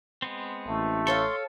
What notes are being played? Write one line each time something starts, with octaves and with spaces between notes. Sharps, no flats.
G#3 B3 C4
A1 A3
A4 C#5 F5 C6 C#6